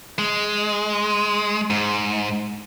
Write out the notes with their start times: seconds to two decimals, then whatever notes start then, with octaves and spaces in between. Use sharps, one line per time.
0.18 G#3
1.70 G#2